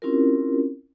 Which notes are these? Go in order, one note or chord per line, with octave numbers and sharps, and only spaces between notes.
C4 C#4 E4 F4 G4 A#4